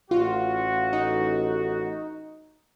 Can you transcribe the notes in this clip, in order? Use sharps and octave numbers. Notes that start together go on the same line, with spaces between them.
A1 F4 F#4
D#4